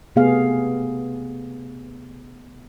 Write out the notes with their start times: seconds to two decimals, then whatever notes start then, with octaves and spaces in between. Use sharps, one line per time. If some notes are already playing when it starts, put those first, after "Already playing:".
0.16 C3 A3 B3 G4 G#4 F5